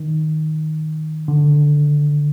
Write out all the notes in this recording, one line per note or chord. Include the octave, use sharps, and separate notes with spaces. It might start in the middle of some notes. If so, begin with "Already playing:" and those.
Already playing: D#3
D3